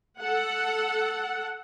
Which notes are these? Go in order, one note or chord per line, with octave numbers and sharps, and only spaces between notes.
A4 F#5